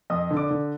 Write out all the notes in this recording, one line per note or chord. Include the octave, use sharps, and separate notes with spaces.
F2 D#5 D#6
D3
D5 D6
D3